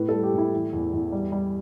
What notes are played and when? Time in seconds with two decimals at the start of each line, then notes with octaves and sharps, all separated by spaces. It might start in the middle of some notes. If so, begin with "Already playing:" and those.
Already playing: A2 B4
0.09 G3 A4
0.23 G4
0.34 A2 E4
0.53 E3
0.73 E2
0.93 E2
1.12 G3
1.32 G3